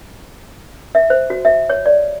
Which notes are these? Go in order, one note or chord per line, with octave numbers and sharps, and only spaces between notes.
E5
C5
F#4
E5
C#5
D5